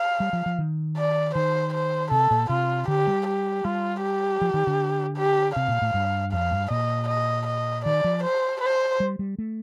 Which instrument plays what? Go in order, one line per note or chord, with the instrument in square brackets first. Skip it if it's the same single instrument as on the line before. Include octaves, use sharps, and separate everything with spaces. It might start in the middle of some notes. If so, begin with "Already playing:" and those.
Already playing: [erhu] F5
[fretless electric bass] G3
F3
F3
D#3
[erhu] D5
[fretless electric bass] D#3 [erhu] C5
[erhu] C5
[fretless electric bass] C3 [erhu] A4
[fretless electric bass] A#2
[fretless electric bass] C3 [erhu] F4
[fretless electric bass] D3 [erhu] G4
[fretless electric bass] G3
[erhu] G4
[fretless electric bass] G3 [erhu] F4
[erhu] G4
[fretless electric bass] F3
D#3
D3
[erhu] G4
[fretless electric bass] C3 [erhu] F5
[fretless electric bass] A#2
A2
G2
[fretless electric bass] F2 [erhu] F5
[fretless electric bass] G2
[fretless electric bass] A#2 [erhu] D#5
[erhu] D#5
D#5
[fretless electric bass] D#3 [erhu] D5
[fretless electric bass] F3
[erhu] C5
C5
[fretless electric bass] G3
G3
A3